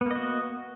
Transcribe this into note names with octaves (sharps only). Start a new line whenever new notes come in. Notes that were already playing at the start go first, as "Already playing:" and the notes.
A#3 B3 F#4 D#5